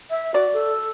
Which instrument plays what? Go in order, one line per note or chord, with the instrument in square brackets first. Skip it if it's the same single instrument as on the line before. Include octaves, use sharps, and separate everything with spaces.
[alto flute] E5
[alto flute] F#4 [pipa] D5
[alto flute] A4